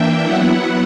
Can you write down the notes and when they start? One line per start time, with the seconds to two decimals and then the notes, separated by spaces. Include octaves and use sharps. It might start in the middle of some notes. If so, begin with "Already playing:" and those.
Already playing: E3 A#3 D4 E5 G5
0.24 F#3 B3 E4 F#5